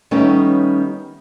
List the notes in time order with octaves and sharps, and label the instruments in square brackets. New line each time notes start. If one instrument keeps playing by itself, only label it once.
[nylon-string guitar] D#3 G3 A3 B3 C#4 D#4